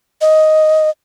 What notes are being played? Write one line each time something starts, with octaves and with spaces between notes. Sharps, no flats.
D#5